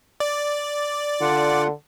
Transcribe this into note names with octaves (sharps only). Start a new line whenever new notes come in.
D5
D3 F4 F#5